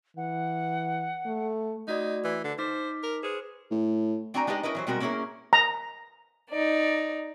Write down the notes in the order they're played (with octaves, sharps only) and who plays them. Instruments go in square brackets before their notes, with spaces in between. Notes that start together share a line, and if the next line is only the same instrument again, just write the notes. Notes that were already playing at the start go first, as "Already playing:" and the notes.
[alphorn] E3 [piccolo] F#5
[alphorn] A3
[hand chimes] A3 F#4 D5 [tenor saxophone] D#4
[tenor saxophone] E3
D3
[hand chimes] D#4 D6 B6 [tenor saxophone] C5
[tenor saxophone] A#4
[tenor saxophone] G#4 [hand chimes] B4 C5
[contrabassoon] A2
[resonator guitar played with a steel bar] C4 D4 F#4 G5 G#5 A#5
G#3 D4 D#4 G4 B4 D#5
C#4 E4 A#4 B4 D#5
E3 F#3 C5
B2 G3 G#3 C4 F#4 A#4
A#3 B3 C#4 E4 G#4 A#4
[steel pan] A#5
[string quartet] D#4 D5